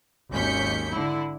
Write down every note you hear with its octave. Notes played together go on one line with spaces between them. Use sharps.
G#1 D#2 C#4 G6 B6 C#7
D3 E4